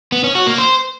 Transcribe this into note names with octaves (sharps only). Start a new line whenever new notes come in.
B3
C#4
F#4
A#3
C5